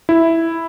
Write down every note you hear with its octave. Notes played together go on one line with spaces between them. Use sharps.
E4